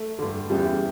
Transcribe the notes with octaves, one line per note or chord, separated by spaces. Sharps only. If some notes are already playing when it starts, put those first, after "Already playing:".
Already playing: A3
G2 D3
E2 C#3 E3 G3